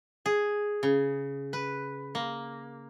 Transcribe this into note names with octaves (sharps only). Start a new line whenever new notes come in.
G#4
C#3
B4
A#3